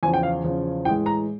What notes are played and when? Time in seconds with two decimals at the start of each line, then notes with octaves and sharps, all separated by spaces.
0.03 E2 C#3 F3 G#5
0.14 G5
0.23 F5
0.44 E2 C#3 F3
0.85 A2 E3 G#3 G5
1.06 A#5